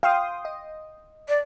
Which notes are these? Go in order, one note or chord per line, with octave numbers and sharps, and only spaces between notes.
F5 G5 C6 D#6
D#5
D5